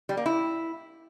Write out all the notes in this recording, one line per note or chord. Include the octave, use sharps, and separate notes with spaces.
G3
A#3
E4